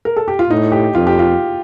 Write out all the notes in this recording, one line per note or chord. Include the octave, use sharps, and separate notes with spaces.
A#4
A4
G4
F4
A2 D#4
G4
F2 F4
G4
F4